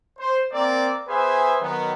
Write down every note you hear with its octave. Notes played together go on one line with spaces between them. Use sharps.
C5
A#3 C4 A#4 D5
B3 G#4 B4 C5 E5 G#5
D#3 F#3 B3